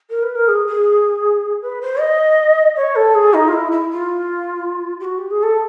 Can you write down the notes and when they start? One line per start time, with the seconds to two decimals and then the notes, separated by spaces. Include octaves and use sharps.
0.10 A#4
0.23 B4
0.35 A#4
0.48 G#4
0.67 G#4
1.62 B4
1.81 C5
2.00 D#5
2.76 C#5
2.95 A4
3.14 G#4
3.34 D#4
3.48 F4
3.53 E4
3.71 E4
3.90 F4
5.00 G4
5.04 F#4
5.17 G4
5.30 G#4
5.43 A4